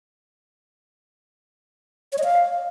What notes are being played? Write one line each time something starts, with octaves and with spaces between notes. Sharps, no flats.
C#5
D#5
F5